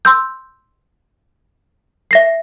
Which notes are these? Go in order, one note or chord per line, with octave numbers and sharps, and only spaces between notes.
C6 E6 G6
E5 A#6 C7